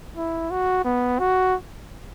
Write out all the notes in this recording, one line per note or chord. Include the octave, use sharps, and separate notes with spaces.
E4
F#4
B3
F#4